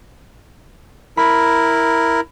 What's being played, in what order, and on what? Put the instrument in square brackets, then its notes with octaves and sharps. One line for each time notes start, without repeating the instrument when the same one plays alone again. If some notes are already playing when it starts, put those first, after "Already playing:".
[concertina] E4 A#4 [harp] B5